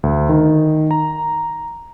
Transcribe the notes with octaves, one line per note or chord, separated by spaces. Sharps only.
D2
D#3
A#5